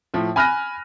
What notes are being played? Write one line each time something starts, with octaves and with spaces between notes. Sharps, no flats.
A2 F3
G#5 B5 F6 F#6 A#6 D#7